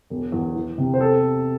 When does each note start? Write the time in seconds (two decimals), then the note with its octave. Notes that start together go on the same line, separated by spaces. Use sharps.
0.10 E1
0.32 E2
0.55 E3
0.78 C3
0.94 C5
1.01 A4